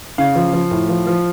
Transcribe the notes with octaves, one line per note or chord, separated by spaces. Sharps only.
C#3 F5
F3
F3
A2
F3
F3